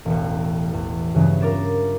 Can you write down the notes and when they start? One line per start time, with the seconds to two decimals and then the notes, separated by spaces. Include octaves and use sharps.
0.05 E1 A1
0.73 E2
1.14 G2 C#3 E3 F#3 G#3
1.41 F4 A#4 D6 A6 E7